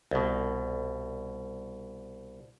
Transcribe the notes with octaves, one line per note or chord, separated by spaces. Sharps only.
C2 B2